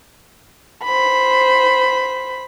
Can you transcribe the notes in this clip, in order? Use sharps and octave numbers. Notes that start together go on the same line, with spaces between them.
C5 B5